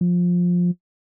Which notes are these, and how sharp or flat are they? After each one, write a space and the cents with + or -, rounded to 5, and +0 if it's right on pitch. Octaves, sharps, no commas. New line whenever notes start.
F3 +15